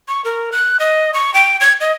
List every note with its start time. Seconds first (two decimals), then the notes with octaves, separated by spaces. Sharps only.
0.08 C#6
0.25 A#4
0.52 F#6
0.80 D#5
1.14 C#6
1.34 G5
1.60 G#6
1.80 D#5